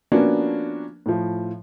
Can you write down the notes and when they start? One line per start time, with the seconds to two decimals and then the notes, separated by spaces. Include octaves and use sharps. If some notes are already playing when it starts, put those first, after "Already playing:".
0.12 F3 A#3 B3 C#4 D4 F#4
1.06 A2 F3